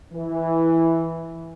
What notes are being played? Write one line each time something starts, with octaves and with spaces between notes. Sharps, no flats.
E3